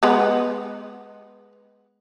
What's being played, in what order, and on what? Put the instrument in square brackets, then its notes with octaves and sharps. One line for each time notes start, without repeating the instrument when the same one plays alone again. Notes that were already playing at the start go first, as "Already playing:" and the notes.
[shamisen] G#3 B3